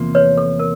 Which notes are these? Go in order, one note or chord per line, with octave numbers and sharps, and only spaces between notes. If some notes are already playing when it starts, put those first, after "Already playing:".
Already playing: E2 C3 F3 A#3
B4 C#5
A4
A#4